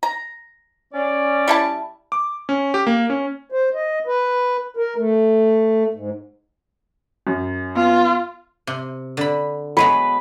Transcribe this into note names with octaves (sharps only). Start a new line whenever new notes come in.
A#5
C#4 D5
G3 E4 A5
D6
C#4
G4
A#3
C#4
C5
D#5
B4
A#4
A3
G#2
F#2
B3 F4
C3
D3 B5
F#3 G#3 B3 B4